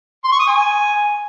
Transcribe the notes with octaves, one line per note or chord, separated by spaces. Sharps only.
C6
C#6
D#6
G#5